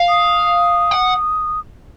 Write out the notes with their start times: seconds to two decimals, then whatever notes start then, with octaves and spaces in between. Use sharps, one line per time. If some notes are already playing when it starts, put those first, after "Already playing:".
Already playing: F5
0.09 D#6
0.91 F#5